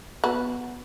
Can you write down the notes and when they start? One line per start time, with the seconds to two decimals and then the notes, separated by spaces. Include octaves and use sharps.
0.24 B3 F#4